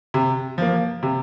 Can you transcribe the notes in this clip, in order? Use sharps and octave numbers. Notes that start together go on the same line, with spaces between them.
C3
F3 A#3
C3